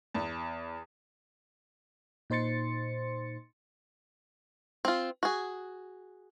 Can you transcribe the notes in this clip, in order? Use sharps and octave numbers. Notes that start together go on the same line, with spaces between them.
E2
A#2 D#4 C5 C6 A6 C#7
C4 F4
F#4 G#4